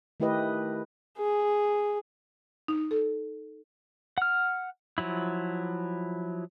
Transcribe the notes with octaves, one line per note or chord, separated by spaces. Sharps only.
D#3 A3 E4 G4 B4 D#5
G#4
D#4
A4
F#5 F6
F3 F#3 E4